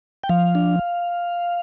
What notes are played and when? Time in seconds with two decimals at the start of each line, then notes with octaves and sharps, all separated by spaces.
0.24 G5
0.29 F3 F5
0.55 D4